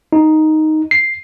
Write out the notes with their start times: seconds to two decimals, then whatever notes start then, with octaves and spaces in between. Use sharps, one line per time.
0.13 D#4
0.91 C7